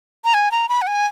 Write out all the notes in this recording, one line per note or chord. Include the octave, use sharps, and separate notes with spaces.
A#5
G#5
A#5
B5
F#5
G#5